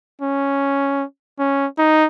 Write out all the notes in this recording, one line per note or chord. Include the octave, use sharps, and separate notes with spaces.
C#4
C#4
D#4